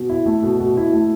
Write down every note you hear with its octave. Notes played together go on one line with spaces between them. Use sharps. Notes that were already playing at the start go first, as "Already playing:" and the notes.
Already playing: B2
E4
A3
B2
B2
E4
A3